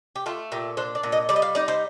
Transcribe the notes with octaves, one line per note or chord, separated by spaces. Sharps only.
G4
A3 F4
A#2 G4
D4 C5
D5
A#2
D#5
G3 D5
D#5
F5
D#4 D5
C5